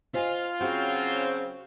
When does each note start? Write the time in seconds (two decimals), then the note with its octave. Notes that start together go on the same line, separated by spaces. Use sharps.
0.14 F4 C5 D#5 F5 G#5
0.61 C#3 F#3 C4 F#4 F#5